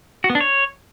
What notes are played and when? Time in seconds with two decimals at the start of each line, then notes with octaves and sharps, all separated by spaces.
0.24 F#4
0.30 B3
0.35 D4
0.41 C#5